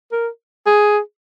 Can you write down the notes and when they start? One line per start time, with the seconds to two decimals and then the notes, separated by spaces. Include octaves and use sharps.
0.12 A#4
0.66 G#4